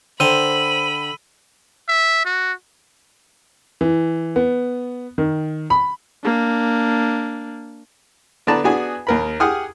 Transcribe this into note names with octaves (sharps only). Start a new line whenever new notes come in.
D3 C5 G5 A#5 B5 E6 D#7
E5
F#4
E3
B3
D#3
B5
A#3 D4
D3 B3 B4 D5 A5 A#5
B3 D4 F#4 G#4 G#5
D#2 A#4 B5
G4 G#4 F#5 D#6 F6